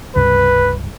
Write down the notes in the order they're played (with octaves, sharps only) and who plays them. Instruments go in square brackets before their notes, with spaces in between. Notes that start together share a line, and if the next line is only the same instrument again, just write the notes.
[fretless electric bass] C#2 G2 C3 [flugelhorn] B4